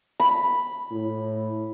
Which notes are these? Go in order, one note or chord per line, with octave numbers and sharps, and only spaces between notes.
B5
A2